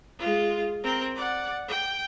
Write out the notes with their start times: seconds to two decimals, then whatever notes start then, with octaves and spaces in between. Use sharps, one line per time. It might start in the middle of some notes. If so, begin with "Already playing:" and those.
0.18 G#3 F4
0.83 C4 A#4
1.15 D5 F#5
1.68 G5